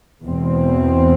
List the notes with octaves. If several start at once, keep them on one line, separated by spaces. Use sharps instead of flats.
E2 B2 G#3 C4